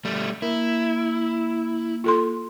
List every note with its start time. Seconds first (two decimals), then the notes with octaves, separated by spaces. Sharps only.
0.05 G3 A3
0.42 A#3 E4 A#4
2.04 F4 A4 C6